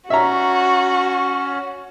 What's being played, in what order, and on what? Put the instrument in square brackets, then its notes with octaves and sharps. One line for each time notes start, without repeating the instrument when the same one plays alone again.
[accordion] C#4 [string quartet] F#4 [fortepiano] E5 A#5